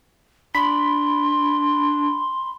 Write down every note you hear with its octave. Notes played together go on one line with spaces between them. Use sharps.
D4 B5 C6